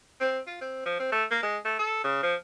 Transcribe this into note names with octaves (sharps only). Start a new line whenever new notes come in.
C4
F4
C4
F3
C4
A3
A#3
G#3
A3
A4
C#3
F3